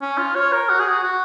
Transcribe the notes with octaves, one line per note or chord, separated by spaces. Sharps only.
C#4
F4
C#5
A#4
F#4
G#4
F#4
F#4